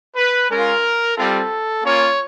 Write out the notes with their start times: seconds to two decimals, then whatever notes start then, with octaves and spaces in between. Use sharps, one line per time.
0.16 B4
0.50 G#3 C#4 F4 A#4
1.17 G3 C4 F4 A4
1.84 A#3 C#4 F4 C#5